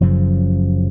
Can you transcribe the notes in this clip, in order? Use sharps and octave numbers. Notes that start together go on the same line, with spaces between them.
F#1 F#2 C#3 F3